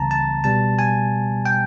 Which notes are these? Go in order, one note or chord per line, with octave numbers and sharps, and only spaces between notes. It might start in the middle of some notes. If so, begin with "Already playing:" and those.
Already playing: C#2 C#3 E3 G3 B3 A5 A#5
A5
B2 G3 B3 A5
G#5
G5